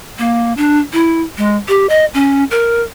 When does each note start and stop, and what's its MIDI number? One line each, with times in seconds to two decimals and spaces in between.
0.19 0.53 58
0.57 0.79 62
0.93 1.22 64
1.37 1.56 56
1.68 1.87 67
1.89 2.05 75
2.14 2.44 61
2.51 2.82 70